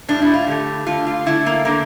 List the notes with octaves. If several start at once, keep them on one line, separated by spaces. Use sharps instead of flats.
A2 G3 D4
E4
F4
D3 A3 G4
D3 A3 F4
F4
D3 A3 E4
A#3
D3 A3 A#3